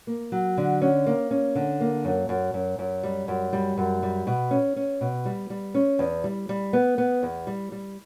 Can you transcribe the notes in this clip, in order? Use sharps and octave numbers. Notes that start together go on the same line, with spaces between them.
A#3
F#3
D3
C#4
A#3
C#4
D3
A#3
F#2
F#2
F#2
F#2
G3
F#2
G3
F#2
G3
B2
C#4
C#4
B2
G3
G3
C#4
E2
G3
G3
B3
B3
E2
G3
G3